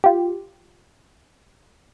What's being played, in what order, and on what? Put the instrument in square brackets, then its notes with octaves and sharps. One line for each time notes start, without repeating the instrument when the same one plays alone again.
[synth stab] F4 G4